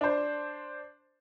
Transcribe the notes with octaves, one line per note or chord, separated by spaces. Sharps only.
D4 C5